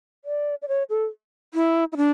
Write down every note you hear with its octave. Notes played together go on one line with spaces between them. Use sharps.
D5
D5
C#5
A4
E4
E4
D4